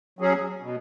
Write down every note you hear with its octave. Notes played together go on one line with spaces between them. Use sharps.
F#3 C#4 G#4
B2